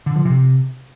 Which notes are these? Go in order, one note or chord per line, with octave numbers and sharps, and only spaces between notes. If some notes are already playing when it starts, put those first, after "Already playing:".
D3
F3
C3